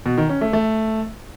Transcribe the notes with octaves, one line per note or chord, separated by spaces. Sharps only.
B2
D#3
C#4
A3
A3